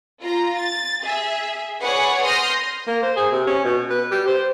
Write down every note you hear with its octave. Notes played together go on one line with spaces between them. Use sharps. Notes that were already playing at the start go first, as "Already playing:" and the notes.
F4 A#5
A6
G#4 E5
G#4 B4 C#5 D5 F#5 G#5
C6 D#6 F6 G6 A#6
A#3
C5
G#4
C3
C#4
B2
B4
G4
C5